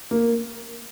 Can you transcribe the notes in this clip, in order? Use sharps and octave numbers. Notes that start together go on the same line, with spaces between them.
A#3